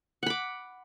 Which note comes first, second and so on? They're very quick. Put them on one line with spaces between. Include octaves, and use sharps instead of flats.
F#5 B5 D6